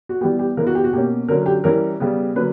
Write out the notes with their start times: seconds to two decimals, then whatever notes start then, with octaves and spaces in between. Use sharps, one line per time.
0.09 F#4
0.21 E3 G3 B3 G4
0.39 G4
0.57 C#3 E3 B3 A#4
0.67 F#4
0.75 G4
0.84 F#4
0.93 B2 A#3 C#4 G4
1.28 D3 F#3 C#4 A#4
1.46 G4
1.64 E3 G3 C#4 A#4
2.00 C#3 G3 B3
2.35 D3 F#3 A#3 C#4 B4